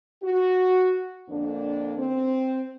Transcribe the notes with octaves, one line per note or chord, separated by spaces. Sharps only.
F#4
F2 D3 A#3 D4
C4